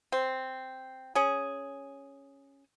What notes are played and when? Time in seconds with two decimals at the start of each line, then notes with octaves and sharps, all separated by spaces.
0.12 C4
1.15 C#4 G#4